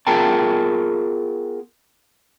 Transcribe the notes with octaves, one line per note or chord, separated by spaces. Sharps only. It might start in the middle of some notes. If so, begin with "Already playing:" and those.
B3 F4 G#4 A#4 G5 A5